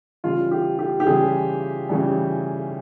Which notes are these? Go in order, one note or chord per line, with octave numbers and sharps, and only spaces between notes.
C#3 E3 G3 F4
G4
G4
G4
C#3 E3 G3 G#4
C#3 E3 G3